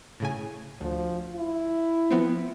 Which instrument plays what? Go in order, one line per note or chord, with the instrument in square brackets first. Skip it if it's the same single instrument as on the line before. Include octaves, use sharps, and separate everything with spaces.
[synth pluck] A2 C#3 G#5
[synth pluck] D2 [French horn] F3
[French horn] E4
[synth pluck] F3 B3 C4